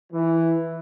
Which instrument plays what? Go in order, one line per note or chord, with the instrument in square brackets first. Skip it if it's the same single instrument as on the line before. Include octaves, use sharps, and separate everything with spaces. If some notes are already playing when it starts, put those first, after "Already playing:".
[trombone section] E3